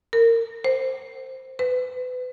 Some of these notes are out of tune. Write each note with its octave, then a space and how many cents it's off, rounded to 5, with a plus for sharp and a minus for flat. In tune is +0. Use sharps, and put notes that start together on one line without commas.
A#4 -25
C5 +0
B4 +35